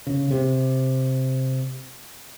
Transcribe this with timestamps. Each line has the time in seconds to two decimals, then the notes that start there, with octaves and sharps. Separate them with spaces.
0.07 C#3
0.31 C3